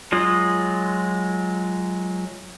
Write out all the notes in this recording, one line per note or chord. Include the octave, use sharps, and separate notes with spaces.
F#3 G#3 F4 D#6